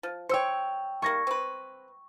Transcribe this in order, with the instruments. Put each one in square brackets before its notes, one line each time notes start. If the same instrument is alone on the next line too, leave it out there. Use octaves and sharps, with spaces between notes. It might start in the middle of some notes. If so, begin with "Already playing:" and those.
[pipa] F3
[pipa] C5 C#5 [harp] G5 E6 C#7
[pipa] D#3 G3 A#3 [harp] C#6 G#6 A#6
[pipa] C4 B4